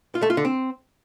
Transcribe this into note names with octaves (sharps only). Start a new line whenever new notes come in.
F4
A3
F4
D3
C4